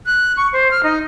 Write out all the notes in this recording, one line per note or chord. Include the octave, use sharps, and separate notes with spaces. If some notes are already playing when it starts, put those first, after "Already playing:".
F#6
C#6
C5
F6
D#4